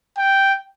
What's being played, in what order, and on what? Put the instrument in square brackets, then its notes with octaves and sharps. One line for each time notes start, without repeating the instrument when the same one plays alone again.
[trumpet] G5